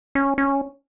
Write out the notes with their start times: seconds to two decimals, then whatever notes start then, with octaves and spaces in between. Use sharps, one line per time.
0.15 C#4
0.38 C#4